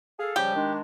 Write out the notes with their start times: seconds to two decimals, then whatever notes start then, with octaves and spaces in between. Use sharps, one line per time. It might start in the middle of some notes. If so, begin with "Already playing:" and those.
0.20 G#4 A4 F5
0.36 C#3 F3 G3 G4
0.55 D#3 G#3 D4